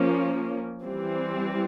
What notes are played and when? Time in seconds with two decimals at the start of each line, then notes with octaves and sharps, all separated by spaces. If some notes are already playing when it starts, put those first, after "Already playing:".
Already playing: F3 A#3 C#4
0.84 E3 G3 C4